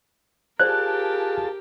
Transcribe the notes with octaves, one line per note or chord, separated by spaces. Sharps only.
F4 G4 G#4 A#4 C5 D5 A5 F#6